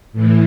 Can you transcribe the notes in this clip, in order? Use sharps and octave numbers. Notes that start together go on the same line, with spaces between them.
A2 E3